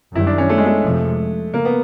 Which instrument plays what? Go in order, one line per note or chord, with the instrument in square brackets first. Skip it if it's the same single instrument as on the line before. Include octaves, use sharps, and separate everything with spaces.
[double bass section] F#2 D#3 G3 [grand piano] E4
[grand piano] D4
C#4
A3
G#3
A3
[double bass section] F2 C3 F3 G#3
[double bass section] C#3 [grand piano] A#3
[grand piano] B3